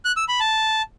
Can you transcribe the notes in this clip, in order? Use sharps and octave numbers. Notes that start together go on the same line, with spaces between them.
F#6
E6
B5
A5